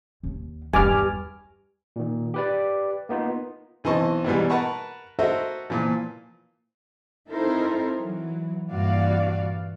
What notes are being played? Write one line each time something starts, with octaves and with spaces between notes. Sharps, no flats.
D#2
E2 G2 D#4 G#5 D6 F6
A#2 D#3
G4 B4 D5
A#3 B3 D#4 F4
B1 E3 C4 D#5 A5 C#6
G#2 B2 E3 G3
A#4 B4 F#5 A5 B5 C#6
F#4 A4 A#4 C5 D#5 E5
A#2 E3 F3
C4 D#4 E4 A4 A#4 C5
E3 F#3
G2 A#2 E3 F#4 D5 F5